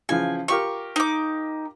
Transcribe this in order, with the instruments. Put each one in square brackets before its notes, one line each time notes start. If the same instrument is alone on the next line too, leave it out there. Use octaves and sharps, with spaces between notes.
[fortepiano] C#3 E3 F3 [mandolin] G#5
[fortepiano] F4 G4 A#4 [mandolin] C#6
[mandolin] D#4 D6